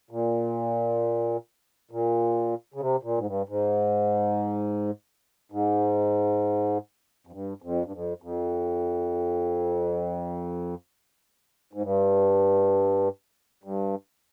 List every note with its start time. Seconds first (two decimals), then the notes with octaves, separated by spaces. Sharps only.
0.11 A#2
1.91 A#2
2.74 C#3
2.81 C3
3.03 A#2
3.18 G#2
3.26 G2
3.49 G#2
5.52 G#2
7.27 F2
7.32 G2
7.62 F2
7.85 G2
7.93 F2
8.22 F2
11.73 G#2
11.82 G2
13.64 G2